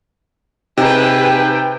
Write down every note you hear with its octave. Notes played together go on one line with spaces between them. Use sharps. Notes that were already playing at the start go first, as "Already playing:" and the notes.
C3 D#4 G4 G#4 B4 G5